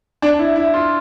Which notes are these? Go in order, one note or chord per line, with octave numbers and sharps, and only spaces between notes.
D4
E4
E4
F4